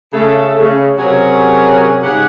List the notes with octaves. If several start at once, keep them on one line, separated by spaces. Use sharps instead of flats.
C#3 A3 A4
C#3
C3 F#3 C#4 G#4 A#4 C#5
G#2 C#3 G4 G#4 F#5